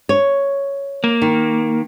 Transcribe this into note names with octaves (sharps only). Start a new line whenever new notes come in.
C#5
A#3
D#3